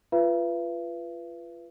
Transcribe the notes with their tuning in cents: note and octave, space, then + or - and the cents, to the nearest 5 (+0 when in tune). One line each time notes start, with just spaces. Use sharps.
F4 -20 B4 +0 E5 +45